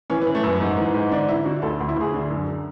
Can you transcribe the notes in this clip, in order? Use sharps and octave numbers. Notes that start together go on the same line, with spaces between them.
E3 C#4
B3
E3
A3
F#2 B3
G#2
E3
G#2
D3 D4
D3 E4
D3 F#4
D2 A4
D2
E4
D2 G#4
D3
F#2